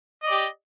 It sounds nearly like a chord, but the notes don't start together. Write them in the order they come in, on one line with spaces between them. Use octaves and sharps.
D#5 D5 G4